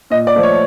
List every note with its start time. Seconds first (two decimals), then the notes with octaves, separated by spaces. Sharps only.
0.10 A#2 D#5
0.27 D5
0.35 F3 A3
0.43 C#5